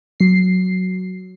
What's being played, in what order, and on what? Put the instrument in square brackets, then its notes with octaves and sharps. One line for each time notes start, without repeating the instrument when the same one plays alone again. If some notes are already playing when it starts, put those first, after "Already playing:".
[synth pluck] F#3 C7